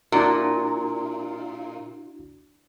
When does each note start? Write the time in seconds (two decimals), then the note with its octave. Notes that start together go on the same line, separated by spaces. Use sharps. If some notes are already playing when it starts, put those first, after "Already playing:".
0.12 A#2 D4 E4 F#4